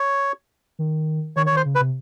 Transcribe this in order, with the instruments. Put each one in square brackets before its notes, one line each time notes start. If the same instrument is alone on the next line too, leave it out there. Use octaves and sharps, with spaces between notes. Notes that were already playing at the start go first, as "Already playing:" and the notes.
Already playing: [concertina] C#5
[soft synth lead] D#3
[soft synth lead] D#3 [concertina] C#5
[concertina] C#5
[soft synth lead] D#3
[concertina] C5
[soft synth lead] C#3
[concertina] B4
[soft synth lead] C3